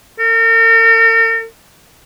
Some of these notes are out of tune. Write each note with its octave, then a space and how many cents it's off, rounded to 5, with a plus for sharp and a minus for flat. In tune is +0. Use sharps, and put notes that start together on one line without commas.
A#4 -45